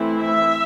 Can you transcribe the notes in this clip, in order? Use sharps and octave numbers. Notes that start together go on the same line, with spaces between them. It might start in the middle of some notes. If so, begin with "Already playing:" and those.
Already playing: E3 A3 C4 E4
E5